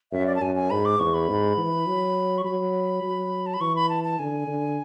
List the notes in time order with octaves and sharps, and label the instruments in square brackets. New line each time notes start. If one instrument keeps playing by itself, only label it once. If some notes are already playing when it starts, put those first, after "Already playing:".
[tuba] F#2 [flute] E5
[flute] D5
A5
[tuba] F#2 [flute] G#5
[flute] G#5
[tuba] G#2 [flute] B5
[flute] D6
[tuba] E2 [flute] C#6
[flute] B5
[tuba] G#2
E3
F#3
[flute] C#6
[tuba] F#3 [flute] B5
[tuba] F#3
[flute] A5
B5
[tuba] E3 [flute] C#6
[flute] B5
A5
A5
[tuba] D3 [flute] G#5
[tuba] D3